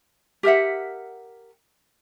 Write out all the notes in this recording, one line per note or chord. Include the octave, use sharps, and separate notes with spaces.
G4 A#4 E5 F#5